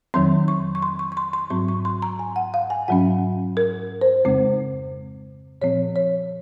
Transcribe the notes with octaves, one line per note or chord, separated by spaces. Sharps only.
F2 D#3 F#3 C4 C6
C#6
C#6
C6
C#6
C#6
C6
C6
G#2 F#3 C4 C#6
C#6
C6
A#5
G#5
F#5
F5
G#5
G#2 F#3 C#4 F#5
A#4
C5
F2 C#3 G#3 C4
A#2 F3 C4 C#5
C#5